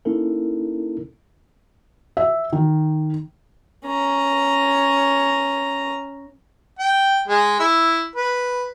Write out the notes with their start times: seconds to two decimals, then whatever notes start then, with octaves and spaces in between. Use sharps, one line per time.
0.05 A#3 C#4 D#4 E4 A4 A#4
2.17 E5
2.53 D#3
3.86 C#4 A#5
6.79 G5
7.27 G#3
7.60 E4
8.15 B4